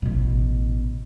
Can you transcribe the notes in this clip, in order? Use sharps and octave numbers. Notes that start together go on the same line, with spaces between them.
A1 B2